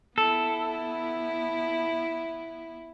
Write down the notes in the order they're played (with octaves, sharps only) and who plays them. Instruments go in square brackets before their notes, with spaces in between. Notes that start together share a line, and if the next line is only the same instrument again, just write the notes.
[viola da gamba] B3 E4 [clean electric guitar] A4